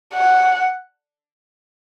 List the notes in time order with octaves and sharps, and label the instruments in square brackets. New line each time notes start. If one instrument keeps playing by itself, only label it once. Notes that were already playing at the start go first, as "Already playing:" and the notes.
[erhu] F#5